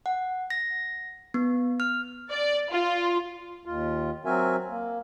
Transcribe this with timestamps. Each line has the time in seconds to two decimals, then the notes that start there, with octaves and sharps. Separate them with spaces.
0.06 F#5
0.50 A#6
1.34 B3
1.80 F6
2.31 D5
2.70 F4
3.65 D#2 F4
4.25 F#3 C4 F#4 A#4 E5 G#5
4.69 A#3